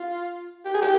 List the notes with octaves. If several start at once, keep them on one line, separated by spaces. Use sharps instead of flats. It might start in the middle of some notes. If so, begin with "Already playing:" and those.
Already playing: F4
G4
G#4
G4